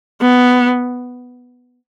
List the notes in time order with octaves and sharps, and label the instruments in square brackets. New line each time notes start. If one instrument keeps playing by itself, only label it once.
[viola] B3